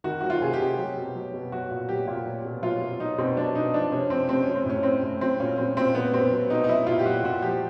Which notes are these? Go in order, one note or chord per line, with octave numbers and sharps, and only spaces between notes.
D#3 F#4
F#3 F#4
F4
C3 G#4
G4
C3
F#3
B2
F#3
B2
F#3 F#4
A#2
F#3 G4
A#2
F#3
B2
F#3 F4
B2
F#3 D#4
B2 C4
F#3 D4
B2 D#4
F3 D4
C3 C#4
F3 C4
C3 C4
F#3 C#4
C4
A2 C#4
F#3 C4
A2
F#3 C4
A#2 C#4
F#3 C4
A#2 C4
F#3 B3
B2 C4
F#3
B2 D#4
D#4
F#3 E4
A#2 F4
G4
F#3 F#4
A#2 F#4
F3 G4